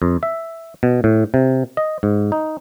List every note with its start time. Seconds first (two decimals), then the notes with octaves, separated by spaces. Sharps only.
0.02 F2
0.23 E5
0.83 B2
1.04 A2
1.34 C3
1.77 D#5
2.03 G#2
2.32 D#4